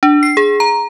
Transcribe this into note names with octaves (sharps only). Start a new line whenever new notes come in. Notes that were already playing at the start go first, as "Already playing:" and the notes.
D4
C7
G#4
A#5